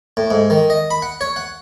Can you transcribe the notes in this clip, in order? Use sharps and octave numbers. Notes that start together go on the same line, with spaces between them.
A2
G#2
D#3
D#5
B5
F#5
C#5
F#5